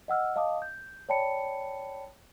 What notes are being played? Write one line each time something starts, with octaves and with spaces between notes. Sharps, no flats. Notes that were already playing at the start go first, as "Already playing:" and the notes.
D#5 F#5 E6 F6
D#5 F5 A5 D6 D#6
G6
C#5 D5 G5 A5 B5 C#7